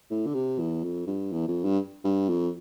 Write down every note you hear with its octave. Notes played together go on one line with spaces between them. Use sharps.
A2
D3
C3
E2
F2
G2
E2
F2
G2
G2
F2